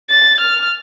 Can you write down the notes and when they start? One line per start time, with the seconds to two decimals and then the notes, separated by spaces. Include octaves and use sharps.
0.10 A6
0.40 F6